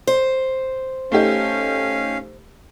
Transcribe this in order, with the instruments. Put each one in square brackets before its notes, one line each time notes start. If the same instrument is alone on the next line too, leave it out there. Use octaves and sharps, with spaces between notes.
[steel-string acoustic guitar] C5
[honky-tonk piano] A3 D#4 G4 [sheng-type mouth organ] C#4 F5